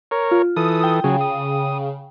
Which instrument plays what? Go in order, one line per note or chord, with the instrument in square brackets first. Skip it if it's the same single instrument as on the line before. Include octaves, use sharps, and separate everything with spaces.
[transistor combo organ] A#4 C#5
[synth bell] F4
[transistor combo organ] E3 A4 [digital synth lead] D#6
[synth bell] G5
[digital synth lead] C#3 [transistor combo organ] F#3 G#4
[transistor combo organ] D#6